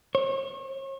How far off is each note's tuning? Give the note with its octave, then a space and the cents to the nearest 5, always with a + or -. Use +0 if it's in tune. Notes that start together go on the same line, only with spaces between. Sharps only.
C#5 -40